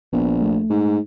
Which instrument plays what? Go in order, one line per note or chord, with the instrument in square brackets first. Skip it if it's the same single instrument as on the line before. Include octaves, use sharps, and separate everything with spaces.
[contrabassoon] A#1 [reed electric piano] B3
[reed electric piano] A3
[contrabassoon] G#2